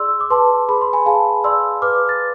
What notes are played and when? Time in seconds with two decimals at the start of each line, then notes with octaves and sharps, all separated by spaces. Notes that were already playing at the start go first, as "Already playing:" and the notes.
Already playing: G#4 D5 C6 E6
0.21 D6
0.30 B4 A5 C6
0.69 G#4 B5
0.81 C6
0.93 G#5 B5
1.06 G#4 F5 A5
1.44 D5 C6 E6
1.82 B4 D6 F6
2.09 A6